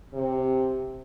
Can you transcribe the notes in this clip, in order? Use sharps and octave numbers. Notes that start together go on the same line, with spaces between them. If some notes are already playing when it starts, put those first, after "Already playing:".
C3